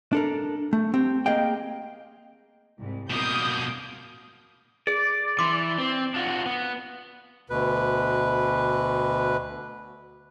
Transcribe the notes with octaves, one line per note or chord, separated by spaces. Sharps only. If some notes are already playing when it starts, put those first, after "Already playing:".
D4 A4 A#4
A3
C4 G4
A#3 G#4 D#5 F5 G5
C2 G#2
B2 A#3 D#6 G6
G#4 D5
E3 C6 D6
C4
D4 F4 F#4
B3
D2 B2 B4